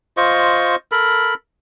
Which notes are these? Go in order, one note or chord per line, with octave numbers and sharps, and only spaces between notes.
F4 C5 D#5 C#6
A4 A#4 B5